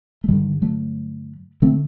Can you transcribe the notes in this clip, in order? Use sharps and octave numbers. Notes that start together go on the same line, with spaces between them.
A3
G2 D3 D#3 G3
F#3 A3
D3 A3 C4